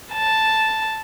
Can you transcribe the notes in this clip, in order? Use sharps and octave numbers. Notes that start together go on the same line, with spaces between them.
A5